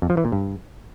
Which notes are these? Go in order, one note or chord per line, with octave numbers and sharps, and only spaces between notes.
F2
F3
E3
A#2
G2